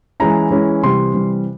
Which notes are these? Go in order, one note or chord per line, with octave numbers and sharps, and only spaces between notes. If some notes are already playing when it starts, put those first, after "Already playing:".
E3 G#3 C#4 E4 A#5
E3 G#3 C#4 E4
C3 E3 G3 C6
C3 E3 G3